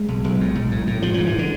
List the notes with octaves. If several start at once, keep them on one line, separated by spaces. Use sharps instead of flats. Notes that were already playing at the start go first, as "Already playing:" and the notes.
Already playing: G#3
B1
B1
A2
B1
A2
A2
G#2 F3
G#2 F3
E3
D3